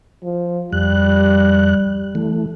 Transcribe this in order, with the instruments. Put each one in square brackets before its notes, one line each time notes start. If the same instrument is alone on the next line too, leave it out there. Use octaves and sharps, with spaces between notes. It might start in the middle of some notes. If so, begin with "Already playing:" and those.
[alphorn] F3
[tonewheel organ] F2 F#6 [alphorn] G3
[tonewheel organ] E3 A3